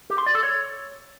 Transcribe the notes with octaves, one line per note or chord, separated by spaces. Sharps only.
G4
C6
D5
A4
C#5